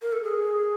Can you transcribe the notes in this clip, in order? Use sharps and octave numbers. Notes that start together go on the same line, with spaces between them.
A#4
A4
G#4